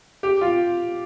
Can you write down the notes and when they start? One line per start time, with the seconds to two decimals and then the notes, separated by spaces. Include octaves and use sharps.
0.23 G4
0.41 F4